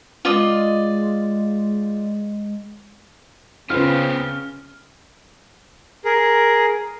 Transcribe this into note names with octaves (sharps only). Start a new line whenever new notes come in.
G#3 F4 D5 D#5
C#3 B3 C4 F4 B4 F6
G#4 A#4